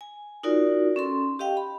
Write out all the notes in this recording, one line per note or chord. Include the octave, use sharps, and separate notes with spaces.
G#5
D#4 F4 F#4 A#4 D5
C#4 A4 C6
G4 D#5 F5 G5
B5